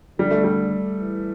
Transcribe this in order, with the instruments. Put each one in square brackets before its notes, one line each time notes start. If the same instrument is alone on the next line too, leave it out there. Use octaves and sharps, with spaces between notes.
[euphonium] D3 [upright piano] G3
[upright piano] A3
G3
[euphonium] E3